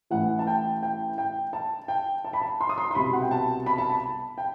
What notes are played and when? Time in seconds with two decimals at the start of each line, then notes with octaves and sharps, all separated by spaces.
0.10 A1 A2 E3 F#5
0.39 A5
0.47 G5
0.83 G5
1.18 G5
1.53 A5
1.88 G5
2.25 A5
2.33 B5
2.42 A5
2.61 C6
2.69 D#6
2.78 C6
2.91 C6
2.95 C2 B2 B5
3.13 F#5
3.22 G5
3.31 A5
3.66 B5
3.78 A5
3.90 B5
4.38 G5